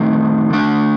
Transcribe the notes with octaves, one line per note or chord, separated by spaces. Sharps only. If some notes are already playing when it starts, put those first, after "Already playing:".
Already playing: D#3 A3 C4 D#4
D3 A3 D4